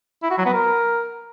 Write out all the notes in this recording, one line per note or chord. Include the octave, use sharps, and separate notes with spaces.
E4
F#4
F#3
B3
A#4